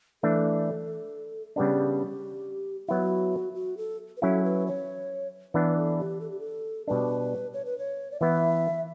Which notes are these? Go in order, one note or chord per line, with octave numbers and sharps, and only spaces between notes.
E3 A3 D4 A4
C#3 G3 B3 D4 G4
F#3 B3 E4 F#4
F#4
A4
B4
F#3 C#4 E4 A4
B4
C#5
E3 B3 D4 B4
A4
G4
A4
G4
A4
B2 G3 D4 B4
C#5
B4
C#5
D5
E3 B3 E4 E5